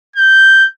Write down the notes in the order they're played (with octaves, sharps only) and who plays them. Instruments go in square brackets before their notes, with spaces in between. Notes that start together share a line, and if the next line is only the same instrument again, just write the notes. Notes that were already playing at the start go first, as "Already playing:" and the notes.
[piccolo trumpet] G6